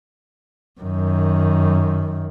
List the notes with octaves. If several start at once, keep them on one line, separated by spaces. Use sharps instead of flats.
F#2 D#3